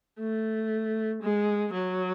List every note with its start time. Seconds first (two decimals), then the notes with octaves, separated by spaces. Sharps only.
0.19 A3
1.22 G#3
1.73 F#3